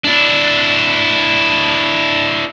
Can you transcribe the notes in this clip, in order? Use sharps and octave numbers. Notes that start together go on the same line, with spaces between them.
D4 E4